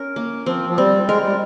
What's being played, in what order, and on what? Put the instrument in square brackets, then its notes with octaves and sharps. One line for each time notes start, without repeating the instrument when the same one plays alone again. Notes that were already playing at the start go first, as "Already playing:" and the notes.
Already playing: [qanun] C#4 A#4
A#3
[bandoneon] F3 [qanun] C4
[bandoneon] F3
[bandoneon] G3 [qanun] C4
[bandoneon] G#3 [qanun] A#4
[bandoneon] G3